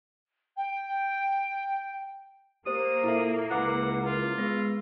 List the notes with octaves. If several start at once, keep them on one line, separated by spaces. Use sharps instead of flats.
G5
A#3 G4 C5 D#6
A#2 E4 A4 E5
C#2 E4 B4 F#5 D6
F4
G#3 B3 B4 A#6